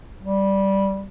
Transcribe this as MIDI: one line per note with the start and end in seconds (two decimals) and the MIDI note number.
0.23 1.08 55